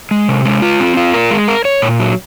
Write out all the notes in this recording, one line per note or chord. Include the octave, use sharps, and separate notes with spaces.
G#3
C3
G#3
F4
C4
F4
A#4
G#3
A#4
C#5
A#2
F#3